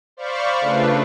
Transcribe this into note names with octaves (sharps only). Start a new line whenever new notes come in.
C5 D5 F5 B5 C#6
C#3 A3 D4 F4 B4